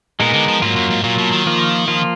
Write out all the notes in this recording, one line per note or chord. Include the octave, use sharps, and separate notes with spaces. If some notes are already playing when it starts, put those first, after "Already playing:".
A#2 G#3 B3 D#4 A#4
D3
F3
G#2 F#3 A#3 F4
F#2
G#2
A#2 F#3 A#3 F4
B2
D#3
F3 A#3 F4
F3 A#3 F4